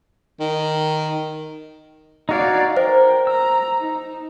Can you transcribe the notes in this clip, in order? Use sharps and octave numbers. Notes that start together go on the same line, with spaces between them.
D#3
D#4 F#4 C#5 D5 F5
A#4 C5 G5
A#5 E6
D#4